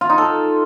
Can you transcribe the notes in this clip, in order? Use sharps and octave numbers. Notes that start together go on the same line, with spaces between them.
F4
D#4
A4